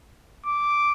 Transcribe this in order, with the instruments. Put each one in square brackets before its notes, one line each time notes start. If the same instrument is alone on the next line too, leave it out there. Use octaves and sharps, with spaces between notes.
[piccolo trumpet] D6